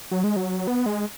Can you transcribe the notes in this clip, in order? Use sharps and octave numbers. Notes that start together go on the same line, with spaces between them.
F#3
G#3
F#3
B3
G#3